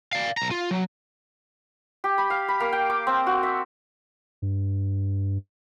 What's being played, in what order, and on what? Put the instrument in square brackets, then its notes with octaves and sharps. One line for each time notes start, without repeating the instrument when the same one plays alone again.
[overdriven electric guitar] D5 F5
B1 A#5
F4
F#3
[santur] G4
B5
F5
B5
A#3
G5
D6
C4
F#4
E5
[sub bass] G2